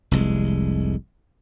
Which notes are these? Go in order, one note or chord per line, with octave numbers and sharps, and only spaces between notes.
F1 C2 G#3